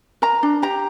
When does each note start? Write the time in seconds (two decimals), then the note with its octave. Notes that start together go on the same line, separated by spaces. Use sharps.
0.22 A#4 A#5
0.43 D4
0.62 G4 A#5